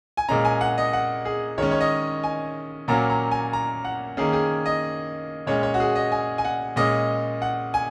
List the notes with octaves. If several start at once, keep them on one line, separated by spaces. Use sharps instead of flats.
G#5
A#2 G#3 C#4 A#5
G#5
F#5
D#5
F#5
G#4
D#3 G#3 C#4 C#5
C#5
D#5
G#5
A#2 F#3 A#3 C#4 A#5
A#5
G#5
A#5
F#5
D#3 A#3 C#4 G#4
G#4
D#5
A#2 G#3 C#4 C#5
C#5
F#4
G#4
D#5
G#5
G#5
F#5
A#2 G#3 C#4 D#5
F#5
G#5